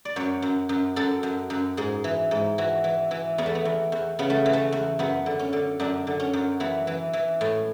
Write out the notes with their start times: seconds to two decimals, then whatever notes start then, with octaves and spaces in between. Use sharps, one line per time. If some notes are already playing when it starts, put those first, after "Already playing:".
0.05 D5
0.16 F#2 C#5
0.42 F#2
0.69 F#2
0.96 F#2 A4
1.23 F#2
1.50 F#2
1.77 G#2 G#4
2.04 E3
2.31 G#2
2.58 E3 F#4
2.84 E3
3.11 E3
3.38 E2 B3
3.46 A3
3.55 B3
3.65 E2
3.92 E2
4.19 C#3 B3
4.30 A3
4.46 E3
4.53 A3
4.72 E2
4.99 F#2 B3
5.26 D3
5.39 C#4
5.53 D3
5.80 F#2 D4
6.07 D3
6.20 C#4
6.33 F#2
6.60 E3 B3
6.87 E3
7.13 E3
7.41 A2